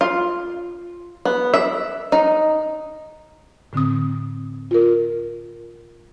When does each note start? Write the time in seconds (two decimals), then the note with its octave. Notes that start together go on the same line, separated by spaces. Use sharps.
0.01 F4
1.25 B3
1.54 E5
2.12 D#4
3.73 A2 D3 C4 D#6
4.71 F4 A#4